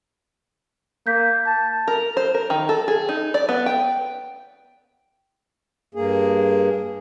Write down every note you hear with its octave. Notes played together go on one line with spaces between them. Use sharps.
A#3 G6 B6
A5
A#4
C5
A#4
D#3
A4
G#4
D#4
D5
B3
G5
G2 A#3 G#4